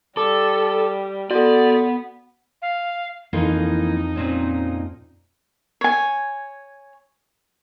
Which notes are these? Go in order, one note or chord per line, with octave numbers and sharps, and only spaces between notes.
G3 A4 D6
B3 F#4 A4 D5
F5
F2 E3 A#3 D#4 F4
A#2 C4 C#4
C#5 G#5